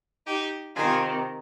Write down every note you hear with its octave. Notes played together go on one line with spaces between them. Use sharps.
D#4 G4
C3 D#3 F4 G#4